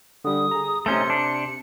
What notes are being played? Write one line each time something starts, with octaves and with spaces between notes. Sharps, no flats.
D3 G3 D#6
G#4 A#5
C3 A3 C#4 D#4 C6 G6 C#7
D4